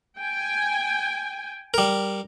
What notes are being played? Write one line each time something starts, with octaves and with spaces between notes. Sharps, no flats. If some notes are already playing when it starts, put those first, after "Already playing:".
G5 G#5
G3 A#4